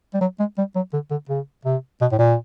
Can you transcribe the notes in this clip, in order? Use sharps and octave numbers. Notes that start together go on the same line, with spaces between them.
G3
F#3
G#3
G3
F#3
D3
D3
C#3
C3
B2
A2
A#2